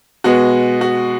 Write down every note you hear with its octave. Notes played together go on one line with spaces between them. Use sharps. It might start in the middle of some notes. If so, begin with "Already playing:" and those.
B2 G#3 B3 F#4
F#4